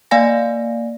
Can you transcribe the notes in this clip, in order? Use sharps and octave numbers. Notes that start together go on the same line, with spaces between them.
A#3 D5 F5 G#5 A#6